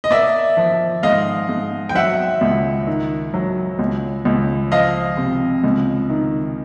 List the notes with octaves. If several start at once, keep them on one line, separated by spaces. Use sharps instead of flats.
D#5
A#3 D5 E5
F3
G#2 D#5 F5
G#2
G5
F#3 E5 F#5
C#2
D#3
F#3
C#2
C#2
F3 D#5 F5
C3
C#2
D#3